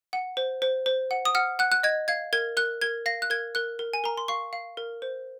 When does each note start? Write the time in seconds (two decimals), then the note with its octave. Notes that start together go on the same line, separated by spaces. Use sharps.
0.13 F#5
0.37 C5
0.62 C5
0.86 C5
1.11 F#5
1.25 D#6
1.35 F#5 F6
1.59 F#5 F#6
1.72 F#6
1.83 D#5 G#6
2.08 F5 G#6
2.33 A#4 G#6
2.57 A#4 F#6
2.82 A#4 G#6
3.06 F5 A#6
3.22 F#6
3.30 A#4 G#6
3.55 A#4 F#6
3.79 A#4
3.94 G#5
4.04 A#4 A#5
4.17 C6
4.28 F5 C#6
4.53 F5
4.77 A#4
5.02 C5